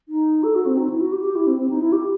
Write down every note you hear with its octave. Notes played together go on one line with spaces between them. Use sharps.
D#4
A4
F#4
C4
D#4
E4
F#4
G4
G4
E4
C4
C4
D#4
E4
G4